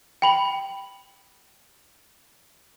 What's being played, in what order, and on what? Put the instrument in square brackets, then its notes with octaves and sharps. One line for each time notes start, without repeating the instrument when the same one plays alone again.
[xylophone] G5 B5 F#7